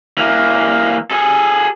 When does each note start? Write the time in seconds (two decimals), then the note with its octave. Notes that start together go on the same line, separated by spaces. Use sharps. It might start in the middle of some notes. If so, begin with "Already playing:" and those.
0.18 E3 A#3
1.11 G#4 A4